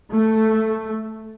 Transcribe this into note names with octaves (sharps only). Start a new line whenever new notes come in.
A3